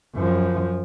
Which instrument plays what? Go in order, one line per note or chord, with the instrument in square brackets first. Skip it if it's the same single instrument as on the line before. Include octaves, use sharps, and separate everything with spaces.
[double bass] F#2 F3